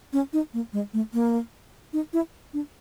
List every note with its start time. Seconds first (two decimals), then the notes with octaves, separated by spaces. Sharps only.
0.13 C#4
0.33 D#4
0.54 A#3
0.73 G#3
0.94 A3
1.14 A#3
1.93 D#4
2.13 E4
2.54 D4